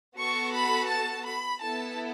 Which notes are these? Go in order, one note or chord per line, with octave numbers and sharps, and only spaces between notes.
B3 F#4 A4 C#6
B5
A5
B5
B3 E4 A4 A5